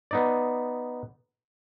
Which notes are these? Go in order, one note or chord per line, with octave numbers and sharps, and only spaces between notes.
B3 D#4 D5